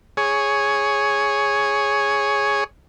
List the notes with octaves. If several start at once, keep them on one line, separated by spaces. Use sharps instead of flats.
G#4 C#5